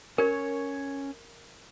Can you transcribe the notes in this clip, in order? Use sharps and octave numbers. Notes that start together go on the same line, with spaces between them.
C#4 A#4 C#5